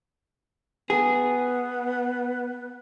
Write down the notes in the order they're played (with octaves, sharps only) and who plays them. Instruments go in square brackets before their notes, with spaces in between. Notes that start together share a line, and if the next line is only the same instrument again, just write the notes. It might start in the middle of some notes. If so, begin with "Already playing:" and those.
[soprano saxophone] B3 [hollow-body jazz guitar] G#4